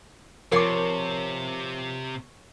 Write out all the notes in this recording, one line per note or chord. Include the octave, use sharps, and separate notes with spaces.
C3 F3 A#4 C#5 A5 C6 D6